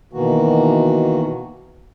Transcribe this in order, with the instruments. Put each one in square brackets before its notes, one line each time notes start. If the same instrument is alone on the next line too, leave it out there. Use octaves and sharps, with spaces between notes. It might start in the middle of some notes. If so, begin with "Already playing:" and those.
[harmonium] B2 D#3 E3 A#3 F#4